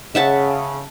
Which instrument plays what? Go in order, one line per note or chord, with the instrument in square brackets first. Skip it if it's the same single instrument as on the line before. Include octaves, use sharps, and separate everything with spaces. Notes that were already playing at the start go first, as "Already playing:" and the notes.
[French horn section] C#3 [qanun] E5 F#5 A5